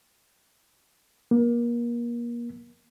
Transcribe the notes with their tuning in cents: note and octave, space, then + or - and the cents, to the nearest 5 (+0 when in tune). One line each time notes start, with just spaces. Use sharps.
A#3 +30